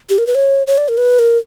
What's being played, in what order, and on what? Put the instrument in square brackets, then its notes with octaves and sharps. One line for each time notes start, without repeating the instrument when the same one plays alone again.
[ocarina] G4
A#4
B4
C#5
C#5
D5
A#4
B4
A#4